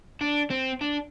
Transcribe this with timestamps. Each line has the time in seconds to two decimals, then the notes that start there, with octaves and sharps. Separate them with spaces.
0.21 D4
0.50 C4
0.81 D4